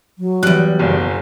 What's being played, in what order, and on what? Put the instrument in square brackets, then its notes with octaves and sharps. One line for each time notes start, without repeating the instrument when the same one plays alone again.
[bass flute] F#3
[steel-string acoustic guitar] E2 G3 [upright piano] F#6
[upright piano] F#1 B1 F#2